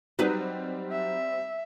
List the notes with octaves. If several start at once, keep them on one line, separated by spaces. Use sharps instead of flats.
F#3 G3 C4 D#4 B4
E5